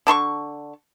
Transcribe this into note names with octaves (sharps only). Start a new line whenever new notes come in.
D3 A5 C6 C#6